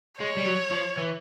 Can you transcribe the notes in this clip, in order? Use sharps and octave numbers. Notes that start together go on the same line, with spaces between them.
G#3 C#5
G3
F#3
F3
E3